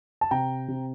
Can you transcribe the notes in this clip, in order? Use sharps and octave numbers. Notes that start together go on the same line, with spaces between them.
A5
C3 G5 A#5
C3